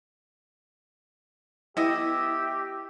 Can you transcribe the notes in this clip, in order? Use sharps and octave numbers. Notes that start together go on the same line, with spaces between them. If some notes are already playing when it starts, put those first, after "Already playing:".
B3 E4 G4 D#5 E5